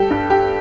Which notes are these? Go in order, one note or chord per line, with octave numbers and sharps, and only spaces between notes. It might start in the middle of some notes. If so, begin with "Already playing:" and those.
Already playing: G3 G4 A4
G2
G4